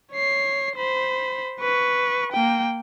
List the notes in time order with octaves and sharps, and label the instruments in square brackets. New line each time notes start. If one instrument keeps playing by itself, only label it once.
[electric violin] C#5 C7
C5 B5
B4 C#6
A#3 G5